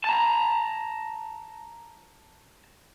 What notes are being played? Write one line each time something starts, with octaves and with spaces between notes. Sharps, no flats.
A5 A#5